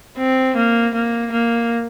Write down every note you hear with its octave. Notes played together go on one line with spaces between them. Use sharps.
C4
A#3
A#3
A#3